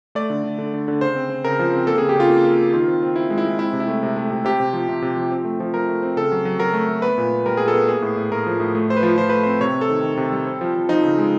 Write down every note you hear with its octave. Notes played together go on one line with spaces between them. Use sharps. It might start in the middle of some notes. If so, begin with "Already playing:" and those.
A3 D5
D3
D3
D3
D3
D3
C#3 C5
C4
C4
C#3 A#4
F3
C4
A#3 A4
G#4
C#3
G4
C#3 F4
A#3
A#3
A#3
D#3 F4
C4
C4
C4 E4
G#3
E4
G#3
C4 E4
C3
E4
A3
C3
A3
C3
C3 G4
C3
F3
C3
C3
F3
C4
A3
F3
F3 A#4
A3
C4
C#3 A4
F#3
F#3
F#3 A#4
A3
A3
B3 B4
A#2
B3
G3 A#4
A#2 G#4
A4
B3
A#3 G#4
A2
A2
A2 A#4
F3
A2
A3
A3 C5
B4
F3
F3 C5
A3 B4
C4 C5
C3 C#5
C3
A4
D#3
D#3
C3
G3
C4
F3
F3
F3 D#4
C#3
G#3